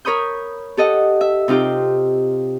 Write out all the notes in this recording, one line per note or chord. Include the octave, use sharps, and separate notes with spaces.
A#4 C#5 B5 D#6 G6
G4 A4 D#5 F#5
E5
C3 D#4 F4 G4 G5